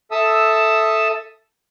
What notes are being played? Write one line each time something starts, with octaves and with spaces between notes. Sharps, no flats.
A4 E5 A5 D#6 E6